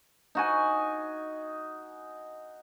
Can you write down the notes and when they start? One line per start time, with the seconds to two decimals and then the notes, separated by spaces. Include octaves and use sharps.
0.35 D#4 F#4 G#5